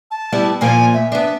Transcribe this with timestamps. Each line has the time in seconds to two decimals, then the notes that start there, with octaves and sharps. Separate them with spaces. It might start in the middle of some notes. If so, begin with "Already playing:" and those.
0.11 A5
0.33 G3 B3 E4
0.61 A#2 F3 A#3 G#5
0.94 E5
1.12 B3 D4 E5